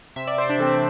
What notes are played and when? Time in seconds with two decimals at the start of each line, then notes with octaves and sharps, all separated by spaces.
0.16 C3 E5
0.27 D5
0.38 C5
0.50 D4 D5
0.58 E3 A3 C4